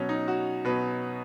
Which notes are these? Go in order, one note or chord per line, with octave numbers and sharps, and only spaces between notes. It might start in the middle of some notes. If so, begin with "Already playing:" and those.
Already playing: B2 F#3 C#4
D#4
F#4
B2 F#3 B4